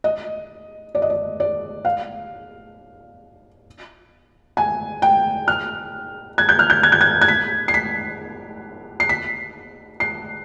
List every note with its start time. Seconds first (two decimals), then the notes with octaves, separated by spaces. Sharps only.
0.04 D#5
0.95 D5
1.02 D#5
1.10 D5
1.40 D5
1.85 F5
4.57 G#5
5.02 G5
5.48 F6
6.38 G#6
6.49 G6
6.59 F6
6.70 G6
6.83 G#6
6.92 G6
7.01 G#6
7.21 G#6
7.28 B6
7.68 C7
7.74 B6
9.00 C7
9.09 B6
10.00 C7